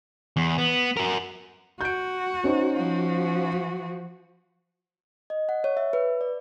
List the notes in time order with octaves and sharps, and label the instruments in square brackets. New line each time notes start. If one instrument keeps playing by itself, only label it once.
[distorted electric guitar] E2
B3
F#4 A#4
[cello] F#4 [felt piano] G6 D7
[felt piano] C#4 D#4 C5
[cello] F3 F#4
[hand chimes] D#5
F#5
C#5
E5
B4
D5